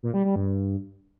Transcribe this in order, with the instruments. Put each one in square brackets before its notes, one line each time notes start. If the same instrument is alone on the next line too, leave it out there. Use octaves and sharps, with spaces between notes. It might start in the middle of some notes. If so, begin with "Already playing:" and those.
[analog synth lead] A#2
G3
G3
G2